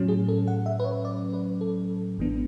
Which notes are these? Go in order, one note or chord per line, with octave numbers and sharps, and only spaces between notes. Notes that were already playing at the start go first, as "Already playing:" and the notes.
Already playing: A2 F#3 C#4
G#4
A4
F#5
E5
B4
C#5
D5
B4
A4
A1 G#2 E3 B3 D4